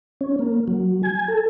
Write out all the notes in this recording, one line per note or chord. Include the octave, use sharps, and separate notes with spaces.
C#4
A#3
F#3
G#5
A4